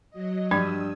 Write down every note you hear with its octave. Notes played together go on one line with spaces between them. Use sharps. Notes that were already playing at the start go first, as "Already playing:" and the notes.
F#3 D#5
G2 F3 D4 G4 G5 D#6 E6 G#6